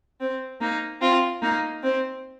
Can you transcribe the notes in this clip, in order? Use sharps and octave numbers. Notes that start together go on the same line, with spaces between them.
C4
A#3 D#4
C4 F4
A#3 D#4
C4